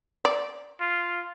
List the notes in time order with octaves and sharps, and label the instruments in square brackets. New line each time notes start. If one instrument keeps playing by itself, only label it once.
[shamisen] D5
[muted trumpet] F4